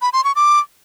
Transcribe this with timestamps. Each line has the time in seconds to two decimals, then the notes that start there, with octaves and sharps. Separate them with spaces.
0.02 B5
0.13 C6
0.24 C#6
0.36 D6